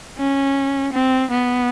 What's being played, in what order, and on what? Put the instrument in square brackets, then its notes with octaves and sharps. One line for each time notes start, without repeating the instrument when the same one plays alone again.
[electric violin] C#4
C4
B3